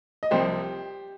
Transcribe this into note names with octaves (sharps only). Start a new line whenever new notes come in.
D#5
C2 C3 F3 G4 C5